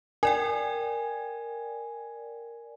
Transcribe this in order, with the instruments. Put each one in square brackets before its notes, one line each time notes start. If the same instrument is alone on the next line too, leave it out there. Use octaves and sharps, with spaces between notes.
[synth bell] A#4 D5 G5 [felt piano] G#5